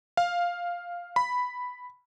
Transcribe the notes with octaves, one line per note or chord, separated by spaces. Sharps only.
F5
B5